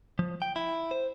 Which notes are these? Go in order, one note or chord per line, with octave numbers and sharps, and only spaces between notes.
F3
G5
E4
C5